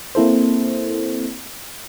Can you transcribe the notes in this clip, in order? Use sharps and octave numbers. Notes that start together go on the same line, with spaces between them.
A#3 C4 E4 A4 C5